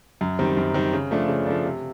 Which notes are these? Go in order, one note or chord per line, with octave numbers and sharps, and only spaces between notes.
F#2
D#3 G3 C4
F#2
D#3 G3 C4
C#3
F3 A3 D4
C#3
F3 A3 D4
C3